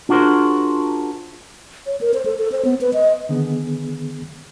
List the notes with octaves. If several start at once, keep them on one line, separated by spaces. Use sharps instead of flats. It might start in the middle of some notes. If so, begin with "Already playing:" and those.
D4 F4 F#4 G#4 A#4 C5
C#5
A#4
C5
A4
A4
C5
B3
B4
D#5
D3 D#3 B3 G#4